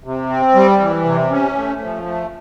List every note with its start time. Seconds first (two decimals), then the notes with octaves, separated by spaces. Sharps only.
0.04 C3
0.30 C4
0.55 G3
0.80 E3
1.05 C3
1.31 C#4
1.55 A3
1.80 F3
2.06 A3